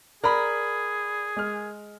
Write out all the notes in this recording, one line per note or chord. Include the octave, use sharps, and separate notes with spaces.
G#4 A#4 D5 B5
G#3 F6